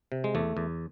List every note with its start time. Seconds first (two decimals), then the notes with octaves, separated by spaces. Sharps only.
0.12 C3
0.24 G#3
0.35 E2 A3
0.57 E2